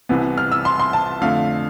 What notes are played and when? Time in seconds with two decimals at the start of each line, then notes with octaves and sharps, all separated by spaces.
0.09 C2 C3 E3 B3
0.38 F6
0.52 E6
0.65 C6
0.79 C6
0.93 A5
1.21 F2 D3 A3 F5